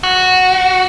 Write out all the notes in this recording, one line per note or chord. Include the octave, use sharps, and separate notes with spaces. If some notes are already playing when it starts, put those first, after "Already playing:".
F#4